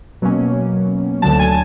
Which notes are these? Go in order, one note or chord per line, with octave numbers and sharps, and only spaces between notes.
B2 F#3 A#3 C#4
D2 D3 F#3 A5
G#5